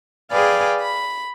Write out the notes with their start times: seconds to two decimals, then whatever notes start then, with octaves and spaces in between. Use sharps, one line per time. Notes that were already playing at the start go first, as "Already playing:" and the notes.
0.31 G#4 B4 D5 F5 G5 G#5
0.81 B5